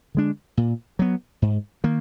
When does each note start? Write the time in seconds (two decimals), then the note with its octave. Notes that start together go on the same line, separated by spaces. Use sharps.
0.15 D3 G#3 D4
0.57 A#2
0.99 F#3 B3
1.42 G#2
1.84 D#3 A#3